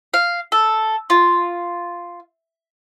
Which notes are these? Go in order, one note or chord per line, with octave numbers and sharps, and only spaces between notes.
F5
A4
F4